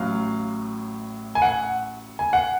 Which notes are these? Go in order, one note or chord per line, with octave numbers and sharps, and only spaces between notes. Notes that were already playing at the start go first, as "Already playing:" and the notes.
Already playing: A1 A2 F#3 F5
G#5
F#5
G#5
F#5